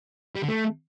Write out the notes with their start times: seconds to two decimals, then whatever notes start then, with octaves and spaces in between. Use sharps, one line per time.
0.36 G3
0.42 D3
0.49 A3